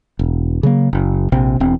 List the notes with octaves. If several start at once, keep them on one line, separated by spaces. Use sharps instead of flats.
E1
C#3 F#3 A#3
F#1
A#1 C3 C4
E1 E2 C4